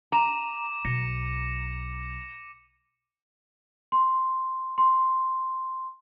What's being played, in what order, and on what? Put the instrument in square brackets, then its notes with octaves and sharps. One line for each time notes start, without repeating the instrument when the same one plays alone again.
[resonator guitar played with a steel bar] A#5 [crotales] D6 D#7 E7
[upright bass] B1 [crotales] A#6 C#7 E7
[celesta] C6
C6